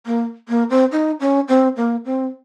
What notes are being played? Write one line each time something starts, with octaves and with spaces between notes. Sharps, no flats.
A#3
A#3
C4
D#4
C#4
C4
A#3
C4